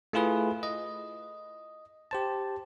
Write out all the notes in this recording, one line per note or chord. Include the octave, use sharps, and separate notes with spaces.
A3 E4 F4 G#4 B4
D#5
G4 C5 A5